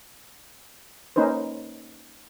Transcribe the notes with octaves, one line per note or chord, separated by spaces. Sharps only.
A#3 C#4 D#4 B4 C5